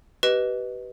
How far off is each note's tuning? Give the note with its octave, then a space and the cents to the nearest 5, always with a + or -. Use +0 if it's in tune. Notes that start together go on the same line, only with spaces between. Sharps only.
G4 -30 B4 +0 D#5 +0